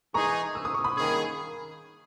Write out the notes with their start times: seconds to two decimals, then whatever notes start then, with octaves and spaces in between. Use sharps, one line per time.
0.14 E3 G#3 D#4 G#4 A#5 C#6
0.55 E6
0.65 D#6
0.74 C#6
0.84 B5 D#6
0.96 G2 D#3 A#3 C#4 G#4